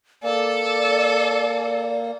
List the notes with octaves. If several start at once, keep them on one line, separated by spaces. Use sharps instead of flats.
A#3 A4 D5